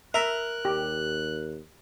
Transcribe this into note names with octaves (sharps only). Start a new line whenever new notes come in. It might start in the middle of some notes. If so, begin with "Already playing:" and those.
A#4 E5 F#6
D#2 G4